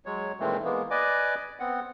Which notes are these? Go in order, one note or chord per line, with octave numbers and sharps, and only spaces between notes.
F#3 G#3 C#5
A#2 D#3 E3 G#3 A3 C4
E3 G#3 A#3 B3
B4 D5 D#5 G#5 D6
B3 C4 F#5